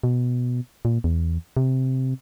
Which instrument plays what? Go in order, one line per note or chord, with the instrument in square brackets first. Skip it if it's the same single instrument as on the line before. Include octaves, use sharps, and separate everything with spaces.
[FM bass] B2
A#2
E2
C3